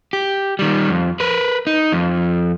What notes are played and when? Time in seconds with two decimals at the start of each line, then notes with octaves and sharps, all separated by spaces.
0.13 G4
0.59 D#3 G3
0.90 F2
1.20 A#4 B4
1.67 D#4
1.93 F2